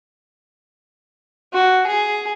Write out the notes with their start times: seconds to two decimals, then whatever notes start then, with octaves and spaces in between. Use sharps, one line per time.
1.53 F#4
1.87 G#4